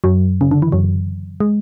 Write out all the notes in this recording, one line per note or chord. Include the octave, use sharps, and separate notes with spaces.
F#2 F#3
C#3
D3
E3
F#2 F#3
G#3